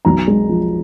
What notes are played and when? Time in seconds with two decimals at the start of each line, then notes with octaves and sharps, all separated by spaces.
0.05 B1 A#5
0.28 G#3
0.49 F3